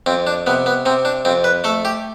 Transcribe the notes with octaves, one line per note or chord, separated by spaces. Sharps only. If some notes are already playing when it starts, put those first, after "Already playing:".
F2 C4
D4
C3 B3
B3
C3 C4
D4
F2 C4
B4
A3 A4
G4